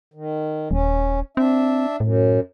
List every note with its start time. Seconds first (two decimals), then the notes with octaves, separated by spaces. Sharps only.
0.14 D#3
0.71 D#1 C#4
1.37 C4 D4 E5
2.00 F#2 A2